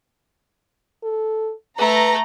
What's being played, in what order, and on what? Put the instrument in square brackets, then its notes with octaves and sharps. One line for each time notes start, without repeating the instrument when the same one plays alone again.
[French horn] A4
[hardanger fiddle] A3 [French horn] B4 [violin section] A#5